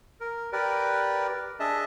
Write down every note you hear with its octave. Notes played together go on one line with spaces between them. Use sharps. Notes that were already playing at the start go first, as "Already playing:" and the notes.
A#4
G4 A#4 B4 D5
D4 G#4 D#5 E5 A5